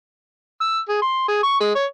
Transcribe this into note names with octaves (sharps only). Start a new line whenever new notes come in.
E6
G#4
C6
G#4
C#6
G#3
C#5